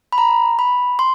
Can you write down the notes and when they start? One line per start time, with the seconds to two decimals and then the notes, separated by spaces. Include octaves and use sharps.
0.12 B5
0.18 A#5
0.59 B5
0.99 C6